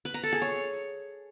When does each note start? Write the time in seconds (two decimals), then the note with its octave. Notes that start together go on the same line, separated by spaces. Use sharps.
0.05 B4
0.14 A#5
0.23 A4
0.33 G#4
0.42 C#5